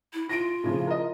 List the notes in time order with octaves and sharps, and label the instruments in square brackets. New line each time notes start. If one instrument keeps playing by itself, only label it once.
[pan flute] E4
[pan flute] F4 [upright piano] A#6 D7
[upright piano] A2 C#3 F3
A#4 D#5